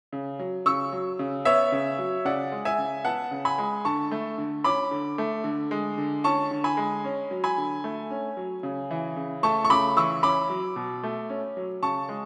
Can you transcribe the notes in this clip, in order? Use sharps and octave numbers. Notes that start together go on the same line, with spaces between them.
C#3
F#3
C#3 C#6 E6
F#3
C#3
B3 C#5 E5
C#3
F#3
C#3 D5 F#5
G#3
E5 G#5
C#3
B3 F#5 A5
C#3
G#5 B5
G#3
D3 A5 C#6
A3
D3
C#4 B5 D6
D3
A3
D3
G#3
D3
C#4 A5 C#6
D3
G#5 B5
G#3
C#4
F#3
G#5 B5
D3
A3
C#4
F#3
C#3
E3
C#3
A3 A5 C#6
C#6
C#3 B5 D6
E3 C#6 E6
C#4 B5 D6
F#3
B2
A3
C#4
F#3
C#3 A5 C#6
G#3